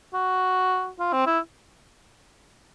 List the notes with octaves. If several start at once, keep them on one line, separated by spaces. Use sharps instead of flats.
F#4
F4
C4
E4